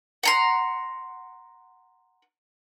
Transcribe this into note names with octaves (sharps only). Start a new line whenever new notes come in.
F#5 A#5 C6